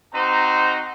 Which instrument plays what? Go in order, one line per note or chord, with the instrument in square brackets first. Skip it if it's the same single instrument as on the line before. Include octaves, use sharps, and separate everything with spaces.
[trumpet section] C4 D#4 F#4 C5 A#5